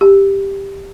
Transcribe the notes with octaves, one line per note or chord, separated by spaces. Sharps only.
G4